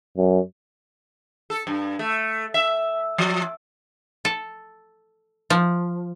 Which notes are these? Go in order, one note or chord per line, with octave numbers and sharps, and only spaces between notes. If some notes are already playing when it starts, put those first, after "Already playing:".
F#2
A4
G2
A3
E5
F3
A4
F3